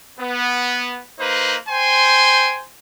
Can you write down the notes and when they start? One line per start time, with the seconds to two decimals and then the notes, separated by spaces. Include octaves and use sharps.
0.19 B3
1.19 A#3 D#4 B4 C5
1.69 C5 G5 G#5 C6